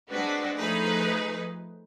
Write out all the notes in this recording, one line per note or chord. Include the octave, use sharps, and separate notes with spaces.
G#3 C4 D4 F#4 B4
F3 A3 D#4 G#4 B4